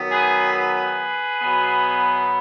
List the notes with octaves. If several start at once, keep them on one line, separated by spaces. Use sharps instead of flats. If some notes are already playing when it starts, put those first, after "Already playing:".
Already playing: D#3 F#3 B3
G#4 B4
G#4 B4
B2 F#3 B3